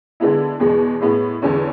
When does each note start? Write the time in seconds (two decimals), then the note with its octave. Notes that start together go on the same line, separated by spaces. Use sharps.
0.20 D3 G#3 B3 E4
0.60 E2 B2 G#3
1.00 A2 G#3 B3
1.42 E2 D3 G#3 C#4